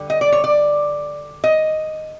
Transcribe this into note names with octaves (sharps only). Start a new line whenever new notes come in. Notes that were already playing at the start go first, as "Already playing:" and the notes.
Already playing: D3 G3
D#5
D5
C#5
D5
D#5